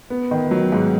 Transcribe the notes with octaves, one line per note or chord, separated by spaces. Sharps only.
B3
D#3
F#3
G#2